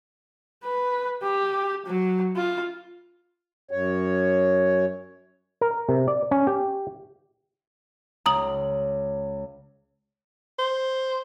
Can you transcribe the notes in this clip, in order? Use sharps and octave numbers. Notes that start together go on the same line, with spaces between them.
B4
G4
F#3
F4
F#2 C#5
A#4
C3
D5
C#4
G4
C#2 A#5 D#6 F#7
C5